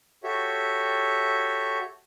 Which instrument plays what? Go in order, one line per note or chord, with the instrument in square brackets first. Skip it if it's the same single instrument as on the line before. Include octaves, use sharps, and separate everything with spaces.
[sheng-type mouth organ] F#4 G4 A4 C#5 E5